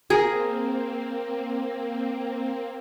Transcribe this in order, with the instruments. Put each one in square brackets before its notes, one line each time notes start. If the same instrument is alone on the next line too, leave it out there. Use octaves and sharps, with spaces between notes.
[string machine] A#3 C4 [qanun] G#4 A#4